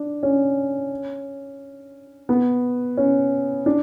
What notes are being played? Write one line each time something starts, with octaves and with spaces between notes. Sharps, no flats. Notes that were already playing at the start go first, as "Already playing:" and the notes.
Already playing: D4
C#4
B3
C#4
D4